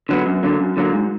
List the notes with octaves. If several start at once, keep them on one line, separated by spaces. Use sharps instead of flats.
D3 F#3 B3
F#2
D3 F#3 A#3
F#2
D3 F#3 A#3
G#2